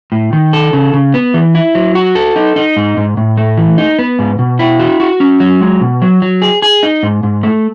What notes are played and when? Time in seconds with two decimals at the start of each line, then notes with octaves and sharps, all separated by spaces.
0.12 A2
0.33 D#3
0.53 A4
0.73 C#3
0.94 C#3
1.14 B3
1.34 E3
1.55 E4
1.75 F#3
1.95 F#4
2.15 A4
2.36 D#4
2.56 D#4
2.76 G#2
2.97 G#2
3.17 A2
3.37 A3
3.57 E3
3.78 D#4
3.99 B3
4.19 G#2
4.39 B2
4.59 E4
4.80 F#4
5.00 F#4
5.20 C#4
5.40 F#3
5.61 G#3
5.81 B2
6.02 F#3
6.22 F#3
6.42 G#4
6.62 G#4
6.83 D#4
7.03 G#2
7.23 G#2
7.43 A3